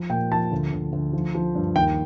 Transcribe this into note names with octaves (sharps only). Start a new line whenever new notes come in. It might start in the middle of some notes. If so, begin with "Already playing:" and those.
Already playing: F3
A#2 G5
F3 A5
D2
D2
D2
F3
F3
G2
D#2 G5